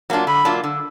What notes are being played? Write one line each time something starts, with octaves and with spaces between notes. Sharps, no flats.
F#3 A#3 D4 F4
D3 B5
F#3 A#3 D4 F4
D3